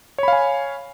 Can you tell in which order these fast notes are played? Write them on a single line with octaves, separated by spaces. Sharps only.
C#5 B5 F5 G#5